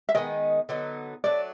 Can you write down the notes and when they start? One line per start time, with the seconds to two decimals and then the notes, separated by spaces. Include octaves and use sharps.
0.09 E5
0.15 D#3 G#3 B3 D#4 D#5
0.69 D3 F#3 B3 D#4
1.24 F#3 A3 D4 D5